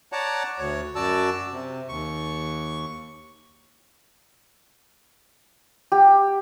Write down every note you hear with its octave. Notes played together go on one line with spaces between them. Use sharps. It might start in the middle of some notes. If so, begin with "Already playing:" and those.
C#5 D5 F#5 A5 A#5
D2 C#5
F#2 F#4 D5 A5 E6
C3
D#2 C#6
G4